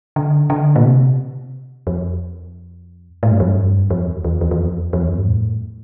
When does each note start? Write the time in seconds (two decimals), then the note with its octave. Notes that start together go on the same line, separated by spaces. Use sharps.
0.16 D3
0.50 D3
0.76 A#2
0.84 C3
1.87 F2
3.23 A2
3.31 G2
3.40 F2
3.48 G2
3.90 F2
4.07 E2
4.25 E2
4.41 E2
4.51 E2
4.59 F2
4.93 F2
5.01 E2
5.09 F2
5.17 G2
5.27 A2